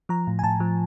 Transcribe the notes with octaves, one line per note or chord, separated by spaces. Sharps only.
F3 A#5
A2
G#5
A2 A5
F3